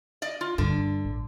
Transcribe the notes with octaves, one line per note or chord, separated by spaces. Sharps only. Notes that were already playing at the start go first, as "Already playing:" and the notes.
D5 D#5
F4
G2 D3
A1